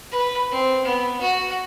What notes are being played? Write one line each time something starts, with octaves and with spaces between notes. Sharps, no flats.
B4
C4
B3
F#4